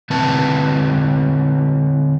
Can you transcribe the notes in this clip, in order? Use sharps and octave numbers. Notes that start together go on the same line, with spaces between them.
D3 C4 E4 B4 A5